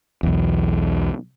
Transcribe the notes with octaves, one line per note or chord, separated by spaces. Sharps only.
B1 E2